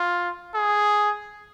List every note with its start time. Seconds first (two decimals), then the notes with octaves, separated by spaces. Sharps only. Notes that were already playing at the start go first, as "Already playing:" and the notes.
Already playing: F4
0.54 G#4